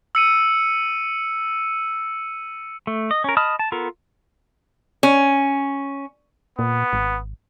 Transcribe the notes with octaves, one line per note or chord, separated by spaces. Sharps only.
E6 C#7 D#7
A3
D#5
C#4 A#4
D#5 A5 B5 D#6 F6
A5
B3 F4 A4 A#4
C#4
A#2 B3
G#1